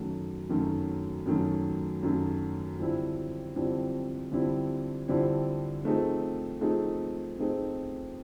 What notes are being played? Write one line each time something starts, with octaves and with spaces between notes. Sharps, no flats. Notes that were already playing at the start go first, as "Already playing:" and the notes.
Already playing: F#2 D#3 F#3 A3
F#2 D#3 F#3 A3
F#2 D#3 F#3 A3
F#2 D#3 F#3 A3
F2 D3 G3 C4 E4
F2 D3 G3 C4 E4
F2 D3 G3 C4 E4
F2 D3 G3 C4 E4
F3 A3 C4 D#4 G#4
F3 A3 C4 D#4 G#4
F3 A3 C4 D#4 G#4